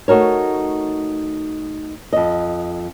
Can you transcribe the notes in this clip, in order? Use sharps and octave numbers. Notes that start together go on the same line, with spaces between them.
A3 D#4 F#4 A#4 C#5
F2 D#5